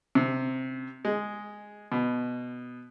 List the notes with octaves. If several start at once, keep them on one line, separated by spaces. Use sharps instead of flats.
C3
G#3
B2